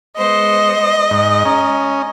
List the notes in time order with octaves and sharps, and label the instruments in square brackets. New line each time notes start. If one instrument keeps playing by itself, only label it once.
[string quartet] G#3 B3 C5 [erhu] D#5
[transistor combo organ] G#2 [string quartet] G#3
[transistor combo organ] C#4 [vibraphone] A#5